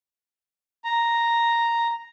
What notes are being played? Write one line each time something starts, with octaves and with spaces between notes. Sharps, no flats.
A#5